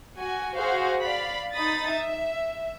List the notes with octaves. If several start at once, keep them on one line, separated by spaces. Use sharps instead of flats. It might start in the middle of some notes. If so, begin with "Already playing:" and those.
F#4 G#5
F#4 G#4 C5 F5
D5 F5 B5
D#4 B5 D#6 A6
E5